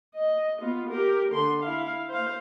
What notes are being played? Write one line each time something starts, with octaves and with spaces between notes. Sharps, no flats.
D#5
B3 F4
G4 A#4
D3 C6
E4 F5
C5 F5